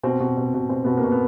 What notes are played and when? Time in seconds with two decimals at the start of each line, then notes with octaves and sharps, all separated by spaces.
0.03 B2 C4
0.20 B2
0.37 B2
0.54 B2
0.69 B2 C4
0.84 B2 B3
0.97 A#3
1.04 B2
1.12 B3